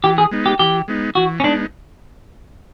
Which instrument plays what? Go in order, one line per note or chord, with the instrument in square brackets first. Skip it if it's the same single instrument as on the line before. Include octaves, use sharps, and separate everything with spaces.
[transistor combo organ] E3 [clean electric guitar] G4
[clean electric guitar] G#4
[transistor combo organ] G#3 B3 D#4
[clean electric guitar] G4
[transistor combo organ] E3 [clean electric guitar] G4
[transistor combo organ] G#3 B3 D#4
[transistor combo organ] E3 [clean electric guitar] F#4
[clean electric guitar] C#4
[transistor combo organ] G#3 B3 D#4 [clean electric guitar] D4